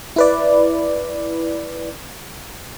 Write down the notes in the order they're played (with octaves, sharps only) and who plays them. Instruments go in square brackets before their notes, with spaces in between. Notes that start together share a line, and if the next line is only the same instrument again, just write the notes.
[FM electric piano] E4 B4 D5